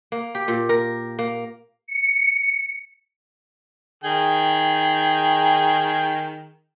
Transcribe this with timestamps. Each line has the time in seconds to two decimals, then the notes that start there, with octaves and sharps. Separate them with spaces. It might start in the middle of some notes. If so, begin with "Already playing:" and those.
0.12 A#3
0.35 G4
0.48 A#2
0.69 A#4
1.19 A#3
1.87 C#7
4.04 D#3 G#4 G5